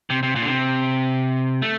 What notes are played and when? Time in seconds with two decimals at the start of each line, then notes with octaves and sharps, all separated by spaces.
0.10 C3
0.23 C3
0.36 A#2
0.42 D3
0.48 C3
1.62 A3